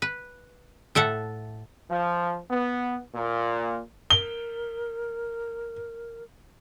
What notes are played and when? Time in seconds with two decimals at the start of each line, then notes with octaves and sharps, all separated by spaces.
0.02 B4
0.95 A2 A4 E5 F#5
1.90 F3
2.49 B3
3.15 A#2
4.10 A#4 G7